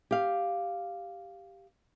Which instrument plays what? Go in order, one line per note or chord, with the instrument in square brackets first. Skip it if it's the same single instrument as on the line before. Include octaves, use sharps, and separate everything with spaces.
[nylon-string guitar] G4 F5